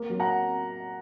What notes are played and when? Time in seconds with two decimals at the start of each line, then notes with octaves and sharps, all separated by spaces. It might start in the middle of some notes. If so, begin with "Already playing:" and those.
Already playing: A#3
0.10 F#3
0.20 F#5 A#5